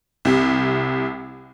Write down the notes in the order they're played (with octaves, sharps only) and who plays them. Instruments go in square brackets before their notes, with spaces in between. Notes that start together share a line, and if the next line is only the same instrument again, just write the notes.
[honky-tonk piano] C2 C3